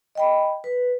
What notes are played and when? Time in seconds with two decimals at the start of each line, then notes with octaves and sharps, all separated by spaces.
0.15 D#5 G5 B5
0.64 B4